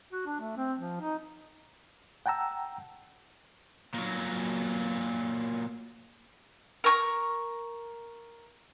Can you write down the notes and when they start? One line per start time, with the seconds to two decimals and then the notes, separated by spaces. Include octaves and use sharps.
0.12 F#4
0.26 D4
0.40 A3
0.57 C4
0.79 F3
1.01 D#4
2.26 F#5 G5 A5 A#5 E6
3.94 A#2 F#3
6.84 A#4 C#6